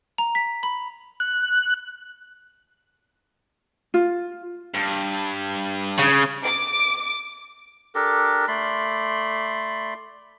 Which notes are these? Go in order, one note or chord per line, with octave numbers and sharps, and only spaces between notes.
A#5
B6
B5
F#6
F4
G2
C#3
D6
D4 G4 A4 A#4
A3 D5 B5 C6